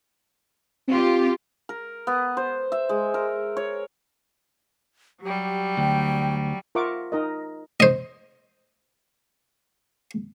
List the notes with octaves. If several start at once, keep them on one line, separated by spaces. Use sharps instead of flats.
C4 F4 G4
A#4
B3
C5
E5
G#3
A#4
C#5
F#3 G3 G4
D2 G5
F4 A#4 E5 F#5 C#6 D6
D#4 A#4 D#5
C5 D#5